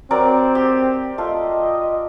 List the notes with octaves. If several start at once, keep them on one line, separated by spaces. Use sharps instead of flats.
F#3 C4 A#4 D5
G4
A3 F4 D#5